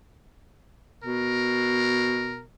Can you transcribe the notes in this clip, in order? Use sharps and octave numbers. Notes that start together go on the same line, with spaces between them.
B2 A#4